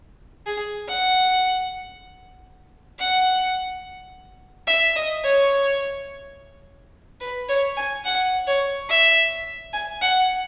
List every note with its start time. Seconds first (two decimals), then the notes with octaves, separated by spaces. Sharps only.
0.46 G#4
0.88 F#5
2.99 F#5
4.67 E5
4.96 D#5
5.24 C#5
7.20 B4
7.49 C#5
7.77 G#5
8.04 F#5
8.47 C#5
8.89 E5
9.73 G#5
10.01 F#5